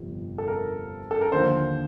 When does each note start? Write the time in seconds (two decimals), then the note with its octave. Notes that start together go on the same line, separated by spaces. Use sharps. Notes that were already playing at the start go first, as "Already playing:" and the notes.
Already playing: G1 F2 C3
0.38 A4
0.48 A#4
1.11 A4
1.21 A#4
1.32 D#2 D3 F3 C5